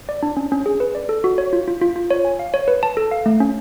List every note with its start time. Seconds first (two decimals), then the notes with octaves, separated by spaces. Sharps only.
0.09 D5
0.23 D4
0.37 C#4
0.52 C#4
0.66 G#4
0.80 B4
0.95 D5
1.09 A4
1.24 F#4
1.38 C#5
1.53 F4
1.68 F4
1.81 F4
1.96 F4
2.11 C#5
2.25 G#5
2.39 F5
2.54 C#5
2.68 B4
2.83 A5
2.97 A4
3.11 F5
3.26 A3
3.40 C#4